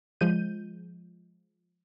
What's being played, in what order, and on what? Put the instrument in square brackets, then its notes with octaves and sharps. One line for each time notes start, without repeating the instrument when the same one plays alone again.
[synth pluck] F3 G#3 G6 D#7